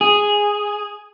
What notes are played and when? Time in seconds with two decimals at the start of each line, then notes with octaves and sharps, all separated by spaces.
0.01 G#4